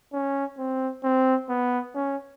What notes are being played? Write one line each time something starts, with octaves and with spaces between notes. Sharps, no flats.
C#4
C4
C4
B3
C#4